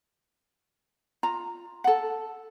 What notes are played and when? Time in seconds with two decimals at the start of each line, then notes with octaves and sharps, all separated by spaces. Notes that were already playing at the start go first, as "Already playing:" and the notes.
1.23 F4 A#5
1.84 A4 F#5